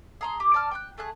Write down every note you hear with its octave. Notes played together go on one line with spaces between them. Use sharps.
G#4 A#5 C6
G4
D5 A5 F6
G5 C6 F#6
A3 G#4 F#6